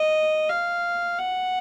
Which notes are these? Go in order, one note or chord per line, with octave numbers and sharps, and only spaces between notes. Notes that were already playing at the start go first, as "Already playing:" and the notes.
Already playing: D#5
F5
F#5